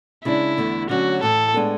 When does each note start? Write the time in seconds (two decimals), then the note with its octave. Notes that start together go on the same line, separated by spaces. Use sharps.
0.24 C#3 G#3 D4 E4
0.58 E2 D3 A3
0.89 D3 F#3 A3 C#4 F#4
1.22 A2 E3 A3 A4
1.54 A2 G#3 B3 D4 A4